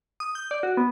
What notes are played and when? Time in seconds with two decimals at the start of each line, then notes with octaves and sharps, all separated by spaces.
0.20 D#6
0.35 G6
0.51 D5
0.63 F#4
0.77 B3